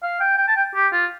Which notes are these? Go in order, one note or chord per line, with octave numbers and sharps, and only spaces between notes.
F5
G5
G5
A5
G5
G4
F4